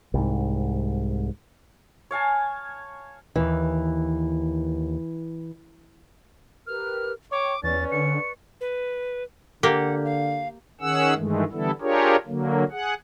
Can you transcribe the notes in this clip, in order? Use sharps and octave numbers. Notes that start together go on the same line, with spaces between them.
C2 G#2
C#5 F5 G#5 A5
D#2 E3
G4 A#4 B4 F6
C#5 G5 C#6 D6
E2 C#4 B4 D5 C#6 A6
D3 C#7
B4
D3 A#3 G4 F#5
F5
D#3 C#4 G#4 F#5 E6
G2 D#3 E3 G#3 A3
D3 E3 G3 B3 E4 A4
D4 F4 G4 G#4 A#4 C#5
D3 F#3 A#3
G#4 F#5